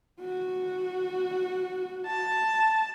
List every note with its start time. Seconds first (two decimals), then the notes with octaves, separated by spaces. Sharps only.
0.22 F#4
2.07 A5